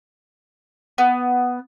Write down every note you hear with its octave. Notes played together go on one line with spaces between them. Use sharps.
B3